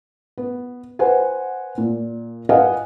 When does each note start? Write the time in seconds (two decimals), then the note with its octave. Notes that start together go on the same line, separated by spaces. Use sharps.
0.38 B3
0.99 B4 C5 F#5 G#5
1.78 A#2
2.49 B4 D#5 F5 F#5 G#5